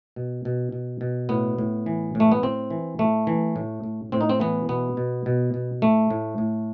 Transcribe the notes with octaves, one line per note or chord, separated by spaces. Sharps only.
B2
B2
B2
B2
A2 B3
A2
E3
A2
A3
B3
A2 C4
E3
A2 A3
E3
A2
A2
A2 C4
D#4
C4
E3 B3
B2 B3
B2
B2
B2
A2 A3
A2
A2